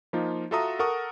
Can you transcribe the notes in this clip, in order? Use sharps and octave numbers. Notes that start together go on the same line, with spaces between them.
F3 A#3 D#4 F4
F4 F#4 A4 E5 A#5 D#6
A4 A#4 F#5 C#6 D#6